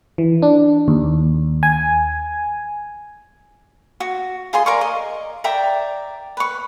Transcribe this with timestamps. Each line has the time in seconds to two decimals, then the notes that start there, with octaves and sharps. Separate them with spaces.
0.18 E3
0.42 D4
0.88 D#2
1.63 G#5
4.00 F#4
4.53 F4 G#4 D#5 C6
4.66 A#4 D5 F5 C#6
4.81 D#5
5.44 D5 E5 G5 A#5
6.37 B4 C#6